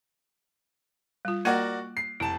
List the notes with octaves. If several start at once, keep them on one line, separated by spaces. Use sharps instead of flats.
G3 F4
A#3 F#4 A#4 D5 D#5 F#5
C7
F1 E4 A5